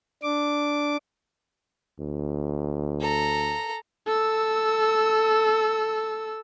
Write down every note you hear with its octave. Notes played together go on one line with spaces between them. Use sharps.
D4 D6
D2
A4 A#5
A4 E6